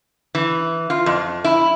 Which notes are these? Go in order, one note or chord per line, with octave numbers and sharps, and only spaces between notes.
E3
F4
F2
E4